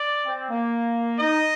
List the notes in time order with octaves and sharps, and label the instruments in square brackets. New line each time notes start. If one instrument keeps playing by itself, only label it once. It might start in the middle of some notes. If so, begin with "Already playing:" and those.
Already playing: [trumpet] D5
[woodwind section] C4
A#3
[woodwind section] D#4 [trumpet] D#5